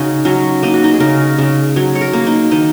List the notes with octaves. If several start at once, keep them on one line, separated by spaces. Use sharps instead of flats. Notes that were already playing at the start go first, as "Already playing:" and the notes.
Already playing: C#3 D#4 F#4 G#4
F#3 C#4
A#3 D#4
F#4
D#4
G#4
C#3 A#4
C#3
F#3 C#5
C#5
A#4
A#3
D#4
D#3 D#4